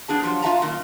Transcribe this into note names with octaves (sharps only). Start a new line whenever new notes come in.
F#3 B3 D4 G#4 A5
F3 F#3 F4 G4
F4 F#4 E5 F5 A5 A#5
F#2 A#2 D#3